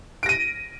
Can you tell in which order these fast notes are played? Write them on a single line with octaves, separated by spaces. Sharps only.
D7 A#6 D#7